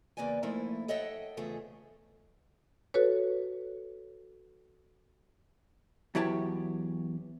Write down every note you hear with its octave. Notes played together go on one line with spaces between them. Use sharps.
E2 C#3 A#3 B4 D5 G#5
F3 A3 A#3 D#4 E4
A4 C#5 D#5 E5 F#5 G5
E2 C#3 F3 A3 G#4
F#4 A4 B4 C#5
E2 F#3 E4 G4 C#5 A5